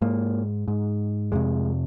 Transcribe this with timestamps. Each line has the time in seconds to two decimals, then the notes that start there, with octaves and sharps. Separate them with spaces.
0.02 G#2 A#3
0.68 G#2
1.32 F2 C3 G#3